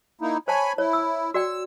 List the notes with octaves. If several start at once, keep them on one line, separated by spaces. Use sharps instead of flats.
A#3 D#4 E4
C5 C#5 G#5 A5 B5
E4 C#5
E6
F#4 D5 G5 E6